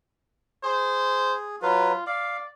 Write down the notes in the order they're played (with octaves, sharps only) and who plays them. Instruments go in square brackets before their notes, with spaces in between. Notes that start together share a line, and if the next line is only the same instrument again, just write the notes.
[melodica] G#4 [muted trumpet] C5
[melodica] F#3 B4 [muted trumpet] F4
[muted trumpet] D5 [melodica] F5